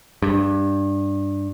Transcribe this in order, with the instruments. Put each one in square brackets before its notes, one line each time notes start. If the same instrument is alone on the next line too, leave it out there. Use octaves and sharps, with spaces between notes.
[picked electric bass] G2